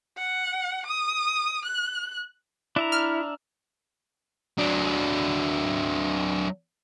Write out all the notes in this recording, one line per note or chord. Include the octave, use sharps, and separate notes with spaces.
F#5
D#6
F#6
D4 E4 E5 A#5
F6
F#3 D4